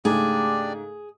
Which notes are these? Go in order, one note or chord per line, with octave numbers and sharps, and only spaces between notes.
G#2 C#3 A3 D4 G4 G#4 D5